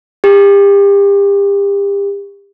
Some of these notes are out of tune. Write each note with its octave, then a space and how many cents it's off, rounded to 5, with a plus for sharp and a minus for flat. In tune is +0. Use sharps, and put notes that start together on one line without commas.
G4 +35